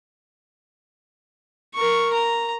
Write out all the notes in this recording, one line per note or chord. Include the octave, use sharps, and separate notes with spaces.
A#4 C#6
A#5